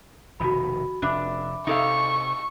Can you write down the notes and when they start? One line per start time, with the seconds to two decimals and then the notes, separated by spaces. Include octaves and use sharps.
0.40 F1 B2 D#3 F#4 B5
1.02 F1 D4 E5 B5 D6
1.67 C3 D#4 A4 F5 C#6